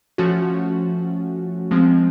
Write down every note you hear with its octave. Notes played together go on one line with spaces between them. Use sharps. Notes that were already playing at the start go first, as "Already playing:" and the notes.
F3 A3 C#4 F#4
F3 G#3 C4